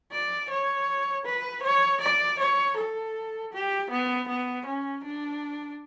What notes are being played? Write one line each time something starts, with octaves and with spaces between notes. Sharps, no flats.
D5
C#5
B4
C#5
D5
C#5
A4
G4
B3
B3
C#4
D4